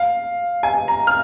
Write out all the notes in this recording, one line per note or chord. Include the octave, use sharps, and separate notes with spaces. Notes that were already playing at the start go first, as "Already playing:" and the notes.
Already playing: F5
G#5
A#5
F6